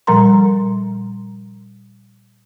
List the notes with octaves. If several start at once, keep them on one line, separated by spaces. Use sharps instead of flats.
A#2 F3 G3 A#4 A#5 C6